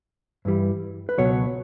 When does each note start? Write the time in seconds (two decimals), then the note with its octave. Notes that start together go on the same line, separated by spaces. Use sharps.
0.45 G2 E3 G3
1.09 B4
1.18 C#2 B2 F#3 C#5